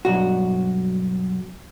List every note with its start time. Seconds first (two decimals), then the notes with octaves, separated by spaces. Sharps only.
0.05 B1 G2 F#4